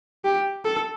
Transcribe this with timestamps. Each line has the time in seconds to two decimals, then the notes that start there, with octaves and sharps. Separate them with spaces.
0.24 G4
0.65 A4